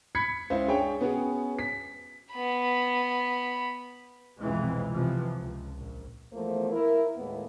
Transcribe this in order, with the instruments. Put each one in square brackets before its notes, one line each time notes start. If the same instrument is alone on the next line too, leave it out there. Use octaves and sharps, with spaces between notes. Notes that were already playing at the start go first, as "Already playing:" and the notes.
[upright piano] B5 G#6 B6 C#7
C#2 E4 C5
D4 G#4 C#5 G5
B3 C#4 F#4 G#4
B6
[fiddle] B3 B5
[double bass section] C2 F2 B2 E3 G#3 C4
C3 E3 F3
C#2
A#1
[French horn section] E2 F3 A3 A#3 C5
E4 A#4
D#2 A2 G#3 A#3 B3